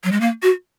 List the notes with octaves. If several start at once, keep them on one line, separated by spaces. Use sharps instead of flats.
F#3
G#3
A#3
F#4